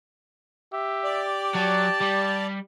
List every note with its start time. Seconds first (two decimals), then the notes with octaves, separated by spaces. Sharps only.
0.73 G4 E5
1.04 D5
1.55 F#3 A5
2.01 G3